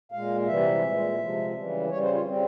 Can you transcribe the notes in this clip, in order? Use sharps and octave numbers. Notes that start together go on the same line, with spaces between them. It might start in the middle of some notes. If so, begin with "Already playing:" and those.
A#2 G#3 F5
C3 E3 G3 E5
A#2 G#3
C3 F3 G#3
C#3 E3 G3
C#3 G3 C#5
C5
F4
C#3 G3 C4